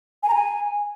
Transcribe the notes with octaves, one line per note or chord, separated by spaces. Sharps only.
G#5
A#5
G#5